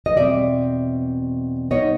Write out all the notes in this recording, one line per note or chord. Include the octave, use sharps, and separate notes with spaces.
D#5
E2 B2 G3 C4 D5 E5
B2 G3 B3 D#4 C#5 D#5